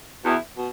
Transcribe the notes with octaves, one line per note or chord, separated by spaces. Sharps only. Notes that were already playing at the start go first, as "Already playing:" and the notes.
E2 B2 B3 E4
B2